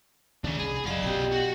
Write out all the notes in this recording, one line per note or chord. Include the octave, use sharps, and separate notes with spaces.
D#2 C#3 D4 G#4
C2 G#4 B5
F#1 F#3 F4 D5 D#5 F5
B1 B2 G4 G5
F#4 F#5